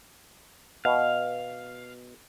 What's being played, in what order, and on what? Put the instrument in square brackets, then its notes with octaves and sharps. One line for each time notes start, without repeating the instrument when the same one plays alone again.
[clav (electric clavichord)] B2 [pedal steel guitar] F5